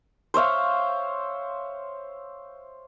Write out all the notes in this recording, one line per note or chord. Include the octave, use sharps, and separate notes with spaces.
C5 C#5 E5 F5